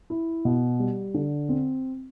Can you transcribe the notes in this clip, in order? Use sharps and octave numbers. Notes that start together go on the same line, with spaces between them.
E4
B2
G3
D3
C4